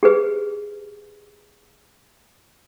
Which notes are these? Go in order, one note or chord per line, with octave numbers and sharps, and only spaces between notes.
G4 G#4 B4